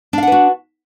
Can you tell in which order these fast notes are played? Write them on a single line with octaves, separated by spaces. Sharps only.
D4 F5 F#5 B4 F#4